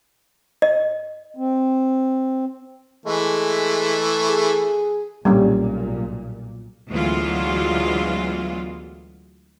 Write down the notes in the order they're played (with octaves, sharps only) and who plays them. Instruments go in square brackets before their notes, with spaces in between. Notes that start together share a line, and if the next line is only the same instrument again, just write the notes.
[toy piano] D#5
[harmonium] C4
[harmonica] E3 A3 [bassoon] G#3
[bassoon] G#4
[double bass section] B1 A#2 [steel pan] G3 A#3 C#4
[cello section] D2 E3 F#3 G#3 B3 F4